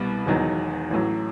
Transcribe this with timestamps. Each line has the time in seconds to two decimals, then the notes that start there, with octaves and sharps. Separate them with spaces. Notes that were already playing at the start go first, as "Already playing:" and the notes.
Already playing: C2 B2 G3 B3
0.26 E1 E2 D#3 F#3 B3
0.91 A1 A2 F#3